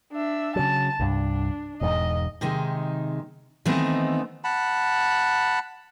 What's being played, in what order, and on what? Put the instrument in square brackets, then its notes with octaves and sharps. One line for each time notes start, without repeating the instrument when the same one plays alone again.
[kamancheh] D4 E5
[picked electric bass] C#3 F#3 [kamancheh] A5
[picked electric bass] C2 G2 [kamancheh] D4
[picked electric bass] E1 E2 G#2 [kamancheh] D#5
[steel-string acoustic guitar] C3 D#3 G#3 D#4
D#3 E3 A3 B3 C4 D#4
[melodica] F#5 A5 B5